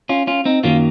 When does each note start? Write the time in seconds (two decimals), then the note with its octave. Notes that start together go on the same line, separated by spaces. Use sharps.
0.09 C#4 F4
0.27 C#4 F4
0.45 C4 D#4
0.64 F#2 D#3 F#3 A#3 C#4 F4